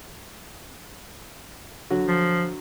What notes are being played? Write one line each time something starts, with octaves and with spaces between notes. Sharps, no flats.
D3 F#3 F#4
F3